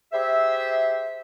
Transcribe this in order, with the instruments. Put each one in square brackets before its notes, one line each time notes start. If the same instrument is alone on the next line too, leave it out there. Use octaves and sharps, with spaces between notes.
[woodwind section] G4 G#4 C5 E5